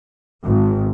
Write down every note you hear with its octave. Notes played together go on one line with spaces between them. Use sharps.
G#1